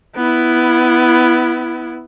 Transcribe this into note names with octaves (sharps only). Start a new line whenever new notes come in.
B3 E4